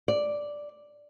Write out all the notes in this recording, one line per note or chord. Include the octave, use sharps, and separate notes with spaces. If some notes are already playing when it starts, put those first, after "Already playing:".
D5